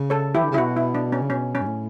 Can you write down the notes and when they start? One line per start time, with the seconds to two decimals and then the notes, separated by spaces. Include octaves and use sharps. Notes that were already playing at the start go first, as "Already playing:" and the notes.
Already playing: C#3
0.10 A4 C#5
0.35 E3 E4 G4
0.44 D3
0.51 C#3
0.54 E4
0.58 B2 F#4
0.77 E4
0.95 D4
1.12 C#4
1.22 C#3
1.30 B2 C#4
1.55 C#4
1.61 G2
1.66 A2